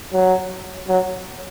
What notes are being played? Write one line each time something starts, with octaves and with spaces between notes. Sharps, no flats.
F#3
F#3